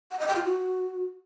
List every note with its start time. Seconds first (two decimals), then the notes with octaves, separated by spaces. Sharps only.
0.11 F#5
0.19 D#5
0.27 G5
0.36 F4
0.44 F#4